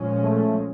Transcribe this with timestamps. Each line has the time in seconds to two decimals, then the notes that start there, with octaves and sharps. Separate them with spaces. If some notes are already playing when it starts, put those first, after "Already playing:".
Already playing: A#2 F3 G#3 C#4
0.21 A3